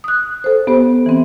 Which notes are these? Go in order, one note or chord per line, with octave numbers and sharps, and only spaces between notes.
D#6 F#6
A4 C5
B3 G4 C5
E3 C4